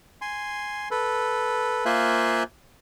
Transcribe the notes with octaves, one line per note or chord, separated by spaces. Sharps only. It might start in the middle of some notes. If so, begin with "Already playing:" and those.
G#5 C6
A4 B4
A#3 F4 C5 E5 G#5 F#6